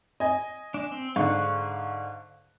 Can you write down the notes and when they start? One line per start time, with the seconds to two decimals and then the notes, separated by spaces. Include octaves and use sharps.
0.20 D#5 G#5
0.74 D4
0.92 C4
1.16 G#2 D3 F5 C#6 F#6